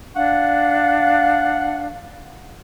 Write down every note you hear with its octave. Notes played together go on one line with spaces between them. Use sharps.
D4 F5 F#5